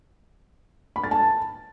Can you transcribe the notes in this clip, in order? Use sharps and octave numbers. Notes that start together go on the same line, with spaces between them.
B5
A6
A5